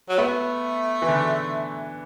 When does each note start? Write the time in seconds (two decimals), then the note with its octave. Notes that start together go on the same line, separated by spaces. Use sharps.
0.09 F#3
0.18 A3 B3
1.02 E3
1.08 D3